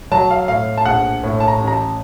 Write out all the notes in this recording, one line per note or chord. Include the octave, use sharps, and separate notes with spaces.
F#3 A5
F5
A2 F5
A5
A#1 F#5
A2
A5
A#5
A1
A#5
A5